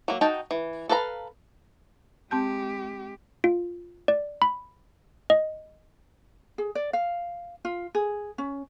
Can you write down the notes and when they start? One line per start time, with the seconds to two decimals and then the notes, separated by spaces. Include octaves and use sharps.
0.08 F#3 A#3
0.21 D#4 F#4 G5 A5
0.51 E3
0.89 A4 B4 F5 A#5
2.31 G#3 C4 G4 A5 G6
3.44 F4
4.08 D5
4.42 B5
5.30 D#5
6.58 G#4
6.75 D5
6.93 F5
7.65 F4
7.95 G#4
8.38 C#4